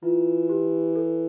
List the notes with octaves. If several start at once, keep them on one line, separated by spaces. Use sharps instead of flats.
E3 F4
G4
A4